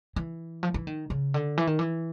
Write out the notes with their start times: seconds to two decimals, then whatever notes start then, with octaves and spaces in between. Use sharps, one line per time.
0.16 E3
0.63 F3
0.74 E3
0.87 D#3
1.10 C#3
1.34 D3
1.57 E3
1.67 D#3
1.79 E3